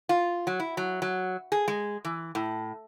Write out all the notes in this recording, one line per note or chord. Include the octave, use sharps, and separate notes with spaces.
F4
F#3
E4
F#3
F#3
G#4
G#3
E3
A2